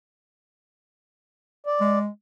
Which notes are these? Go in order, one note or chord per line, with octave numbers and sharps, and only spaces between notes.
D5
G#3